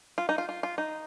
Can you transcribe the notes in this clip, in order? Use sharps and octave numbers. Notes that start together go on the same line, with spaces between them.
F4
D#4
F4
F4
F4
D#4